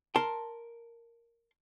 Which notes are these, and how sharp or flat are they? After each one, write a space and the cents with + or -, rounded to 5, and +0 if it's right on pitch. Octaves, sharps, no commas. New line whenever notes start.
A#4 +0 A5 +5 C6 +0